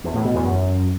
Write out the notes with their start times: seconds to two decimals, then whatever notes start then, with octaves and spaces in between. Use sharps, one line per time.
0.04 E2
0.14 A2
0.24 B2
0.34 E2
0.44 F#2